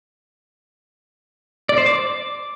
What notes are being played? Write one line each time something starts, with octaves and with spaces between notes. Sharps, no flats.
D5
C5
D6